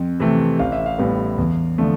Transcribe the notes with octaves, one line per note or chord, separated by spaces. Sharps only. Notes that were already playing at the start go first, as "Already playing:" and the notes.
Already playing: F2
C3 E3 A3 C4
A1 F5
E5
F5
A2 G3 B3
E2
D3 F3 A3